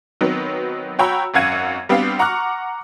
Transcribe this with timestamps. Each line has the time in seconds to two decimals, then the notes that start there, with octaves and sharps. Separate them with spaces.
0.21 D#3 F#3 B3 C4
0.99 F#4 C#5 G5 A#5 B5 E6
1.34 G#1 F#2 F5 F#5 G#6 D#7
1.89 G3 B3 C4 D4 G4 F5
2.19 F#5 A#5 C#6 D6 F6 F#6